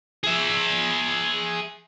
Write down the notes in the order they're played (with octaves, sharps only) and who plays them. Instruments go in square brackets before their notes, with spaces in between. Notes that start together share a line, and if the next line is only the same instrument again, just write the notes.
[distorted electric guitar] G#4 E5